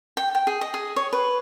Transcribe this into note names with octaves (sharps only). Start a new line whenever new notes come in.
G5
G5
G#4
D#5
G#4
C#5
B4